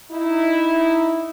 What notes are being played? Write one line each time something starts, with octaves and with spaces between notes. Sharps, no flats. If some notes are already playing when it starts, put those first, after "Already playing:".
D#4 E4